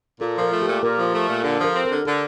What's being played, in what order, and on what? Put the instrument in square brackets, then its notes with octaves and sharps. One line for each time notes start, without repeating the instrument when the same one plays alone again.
[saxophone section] A#2 [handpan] A4
[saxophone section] F3 [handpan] A#4
[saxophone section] A3
[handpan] G4
[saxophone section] A#2
[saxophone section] A#2 [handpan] A#4
[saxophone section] F3
A3
A#2
[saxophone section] D3 [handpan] A4
[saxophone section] F3
[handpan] A#4
[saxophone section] C4
[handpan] A#4
[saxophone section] D3
[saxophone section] D3 [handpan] A4